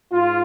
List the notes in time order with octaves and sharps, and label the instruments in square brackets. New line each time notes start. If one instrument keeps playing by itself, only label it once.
[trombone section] G#2 F4